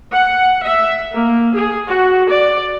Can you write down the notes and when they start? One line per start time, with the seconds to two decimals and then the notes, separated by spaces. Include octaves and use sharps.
0.13 F#5
0.62 E5
1.14 A#3
1.55 G#4
1.87 F#4
2.29 D5